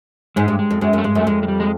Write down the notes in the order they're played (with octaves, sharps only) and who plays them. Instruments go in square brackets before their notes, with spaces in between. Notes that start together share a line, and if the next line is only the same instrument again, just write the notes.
[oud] G#2 [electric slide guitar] G#3
[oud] G2
[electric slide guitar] G#3
[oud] F2
[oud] F#2 [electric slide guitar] G#3
[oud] F#2
[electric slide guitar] A3
[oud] G2 [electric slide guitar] G#3
[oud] F#2 [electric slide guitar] A3
[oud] F2 [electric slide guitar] G#3
[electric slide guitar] G#3
G3
G#3